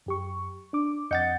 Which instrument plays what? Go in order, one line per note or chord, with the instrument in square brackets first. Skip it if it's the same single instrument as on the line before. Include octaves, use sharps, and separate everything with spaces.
[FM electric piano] F#2 G4 C#6
D4 D6
[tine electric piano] F2 F#5 A6 [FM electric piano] D#5 G6 C#7